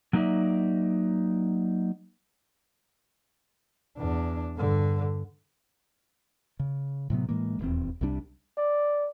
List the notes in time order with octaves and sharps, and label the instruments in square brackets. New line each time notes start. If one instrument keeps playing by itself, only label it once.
[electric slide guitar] F#3 A#3 D#4 F4 D5 E5
[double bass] E2 D4
G2 D3
[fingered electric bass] C#3
A2 C3 F#3 B3
A2 E3 G#3 A#3
D#1 E2 C4
C2 C3 G3 D4
[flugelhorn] D5